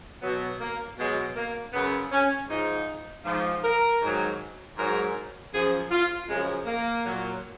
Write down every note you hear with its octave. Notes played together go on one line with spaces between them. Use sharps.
B2 F#3 B3
A#3
B2 F#3 G#3
A#3
F#2 C#3 F#3 B3
C#4
G#2 F3 D#4
G#2 F3
A#4
G#2 D#3 F#3
G#2 F#3 A#4
F#2 F3 G#4
F4
F#2 C#3 F3 G#3
A#3
A#2 F#3